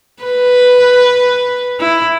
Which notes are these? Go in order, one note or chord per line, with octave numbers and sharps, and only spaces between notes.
B4
E4